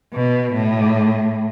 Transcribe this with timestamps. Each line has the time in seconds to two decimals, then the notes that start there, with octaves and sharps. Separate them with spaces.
0.13 B2
0.54 A2